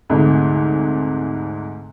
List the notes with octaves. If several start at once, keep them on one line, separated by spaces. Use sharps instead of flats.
D2 G#2 C3